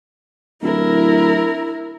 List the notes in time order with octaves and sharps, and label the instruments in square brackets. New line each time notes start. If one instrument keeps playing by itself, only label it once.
[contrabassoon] D1 [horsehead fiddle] E4 A#4